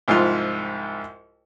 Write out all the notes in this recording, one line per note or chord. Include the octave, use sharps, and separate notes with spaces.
C2 G#2 F3 F4